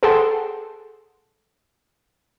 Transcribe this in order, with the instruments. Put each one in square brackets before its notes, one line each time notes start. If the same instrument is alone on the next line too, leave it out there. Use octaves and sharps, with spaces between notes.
[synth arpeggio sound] G#4 A4 F#5 G5 A5 C6